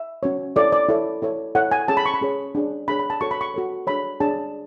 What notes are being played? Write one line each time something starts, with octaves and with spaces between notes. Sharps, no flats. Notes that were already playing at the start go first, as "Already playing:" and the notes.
Already playing: E5
C#4 F#4 C#5
E4 A4 C#5 D5
D5
E4 A4 C#5
E4 A4 C#5
E4 A4 C#5 F#5
G#5
C#4 G#4 C#5 A5
B5
C#6
B5
C#4 G#4 C#5
D4 G#4 C#5
D4 G#4 C#5 B5
B5
A5
F#4 A4 C#5 C#6
B5
C#6
F#4 A4 C#5
D4 G#4 C#5 B5
D4 G#4 C#5 A5